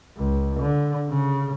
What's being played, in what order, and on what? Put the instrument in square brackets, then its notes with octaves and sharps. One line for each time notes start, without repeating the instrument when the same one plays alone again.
[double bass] C#2
D3
C#3